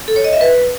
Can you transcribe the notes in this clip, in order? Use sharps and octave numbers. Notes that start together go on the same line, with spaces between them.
A4
C#5
D#5
E5
B4